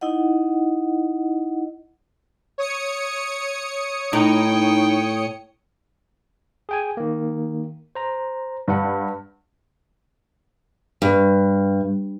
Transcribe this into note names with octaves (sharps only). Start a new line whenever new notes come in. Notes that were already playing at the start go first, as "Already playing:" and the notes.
D#4 E4 D#5 F#5
C#5 D#6 C#7
A2 D#4 G5
G#4 G5 G#5
D#3 A#3
C5 A#5
G2 D4 B4 F#5
G2